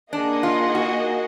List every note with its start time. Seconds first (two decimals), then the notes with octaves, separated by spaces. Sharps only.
0.12 A#3 D4 D#4 G#4 D#5 F#5
0.43 F4
0.75 F#4